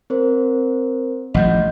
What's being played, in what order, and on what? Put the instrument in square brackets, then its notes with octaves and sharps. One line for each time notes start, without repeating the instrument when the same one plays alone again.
[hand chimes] C4 A#4 C5
[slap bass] A1 F3 G3 [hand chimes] D#5 F#5 G6